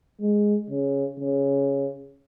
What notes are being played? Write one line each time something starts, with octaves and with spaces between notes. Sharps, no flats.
G#3
C#3
C#3